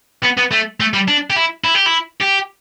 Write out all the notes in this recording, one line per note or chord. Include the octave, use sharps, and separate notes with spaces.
B3
B3
A3
A3
G3
D4
G4
E4
E4
G4
E4
G4